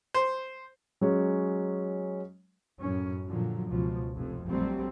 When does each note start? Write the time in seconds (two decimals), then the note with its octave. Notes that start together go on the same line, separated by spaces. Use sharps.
0.14 C5
1.01 F#3 G#3 C#4
2.81 F#2 A2 C#4
3.27 A#2 D3 F3 F#3
3.67 C#2 B2 F3
4.13 F1 F2
4.47 A#1 F#3 G3 A3 C4